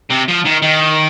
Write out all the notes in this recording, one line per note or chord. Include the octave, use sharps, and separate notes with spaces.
C3
F3
D#3
D#3